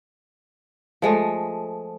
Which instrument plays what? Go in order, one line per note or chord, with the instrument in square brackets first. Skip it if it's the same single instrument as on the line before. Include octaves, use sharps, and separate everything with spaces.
[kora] F3 G#3 A3